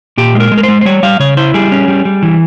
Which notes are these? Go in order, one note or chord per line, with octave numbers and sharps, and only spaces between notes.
A#2 G4
G#3
A#4
G#3
A#4
C5
G#3
C5
G3 C#5
G3 F5
C#3 C#5
E4 C5
G3 G#4
C#4
G3
G3
E3